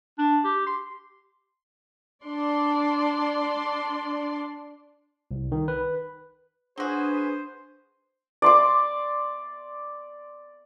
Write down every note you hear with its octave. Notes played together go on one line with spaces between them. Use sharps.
D4
G4
C6
D4 D5 C6
C2
D#3
B4
F#3 D4 F#4 G#4 B4 C5
D5 C6 D6